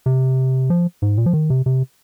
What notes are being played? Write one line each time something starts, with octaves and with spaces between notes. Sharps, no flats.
C3
F3
G#2
A#2
F3
D#3
C3
C3